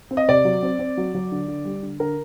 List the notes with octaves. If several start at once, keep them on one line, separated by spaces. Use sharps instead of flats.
C4
D#5
C3 D5
F#3
C4
C4
F#3
F#3
D3
D3
G3
D3
D3 A#4